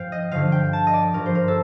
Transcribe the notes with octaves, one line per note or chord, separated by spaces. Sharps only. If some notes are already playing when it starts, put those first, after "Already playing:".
Already playing: G2 F3 F5 G5
D#5
G2 D3 F3 F5
G5
A5
D#5
D5
G2 F3 A#4
C5
A#4
A4